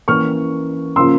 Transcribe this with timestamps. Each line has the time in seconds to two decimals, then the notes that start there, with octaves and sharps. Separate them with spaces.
0.08 E3 A#3 C#4 C#6 F6
0.96 C#3 F3 A#3 C#4 C6 E6